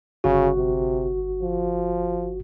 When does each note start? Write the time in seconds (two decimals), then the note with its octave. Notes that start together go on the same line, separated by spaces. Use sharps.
0.24 G1 C#3 F#4
0.57 C3
1.42 F3